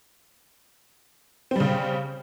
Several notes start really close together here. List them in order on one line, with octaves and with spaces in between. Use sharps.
C4 G3 C#3